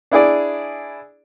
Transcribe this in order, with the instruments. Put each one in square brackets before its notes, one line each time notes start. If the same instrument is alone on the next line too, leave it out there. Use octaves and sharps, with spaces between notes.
[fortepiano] D4 E4 G#4 D5